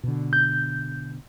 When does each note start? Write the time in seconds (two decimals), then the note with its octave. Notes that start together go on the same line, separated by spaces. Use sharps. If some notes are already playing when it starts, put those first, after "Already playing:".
0.03 B2 D3
0.33 G6